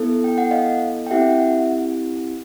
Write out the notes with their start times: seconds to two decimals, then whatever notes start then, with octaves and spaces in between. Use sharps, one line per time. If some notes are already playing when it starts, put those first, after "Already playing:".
Already playing: B3 E4 A4
0.24 G5
0.38 F#5
0.51 D#5 F5
1.06 G5
1.11 C4 E4 G4 E5 F#5